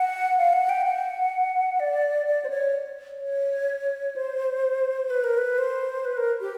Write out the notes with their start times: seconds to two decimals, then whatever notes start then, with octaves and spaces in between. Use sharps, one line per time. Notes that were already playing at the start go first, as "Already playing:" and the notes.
Already playing: F#5
0.37 F5
0.53 F#5
0.69 G5
0.84 F#5
1.80 D5
2.26 D5
2.45 C5
2.50 C#5
3.21 C#5
4.16 C5
5.10 B4
5.24 A#4
5.38 B4
5.58 C5
6.05 B4
6.17 A#4
6.41 G4